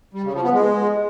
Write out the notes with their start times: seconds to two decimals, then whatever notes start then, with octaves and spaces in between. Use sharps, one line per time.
0.14 G3
0.24 C#3
0.33 F3
0.43 B3
0.53 G#3